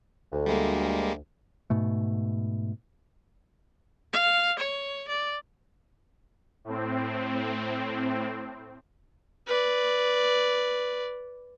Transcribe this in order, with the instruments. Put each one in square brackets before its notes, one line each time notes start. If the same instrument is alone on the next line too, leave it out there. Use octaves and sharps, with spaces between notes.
[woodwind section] D2
[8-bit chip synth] G3 G#3 A#3
[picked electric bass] G#2 B2 A3
[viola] F5
C#5
D5
[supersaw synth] A2 C4
[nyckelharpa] B4 D5